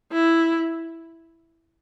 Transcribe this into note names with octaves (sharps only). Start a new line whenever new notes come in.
E4